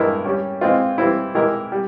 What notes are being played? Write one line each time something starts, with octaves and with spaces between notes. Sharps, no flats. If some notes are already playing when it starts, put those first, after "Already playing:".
Already playing: G2 E3 G#3 E4 A#4
G3 C#4 G4
E3 G#3 C4 F4
E3 G3 C4 E4
E3 G#3 E4 G4 A#4
G3